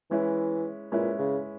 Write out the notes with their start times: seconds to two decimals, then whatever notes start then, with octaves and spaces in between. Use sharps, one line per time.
0.10 E3 G#3 C#4 E4 B4
0.92 A#2 G#3 C#4 E4 B4
1.19 C#3